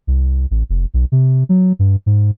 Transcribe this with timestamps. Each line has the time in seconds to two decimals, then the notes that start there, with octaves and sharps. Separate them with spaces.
0.07 C2
0.51 A1
0.69 F1
0.94 B1
1.12 C3
1.49 F#3
1.79 G2
2.06 G#2